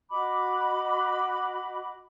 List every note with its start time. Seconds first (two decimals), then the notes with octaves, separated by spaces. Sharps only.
0.10 F#4 D#5 B5 D6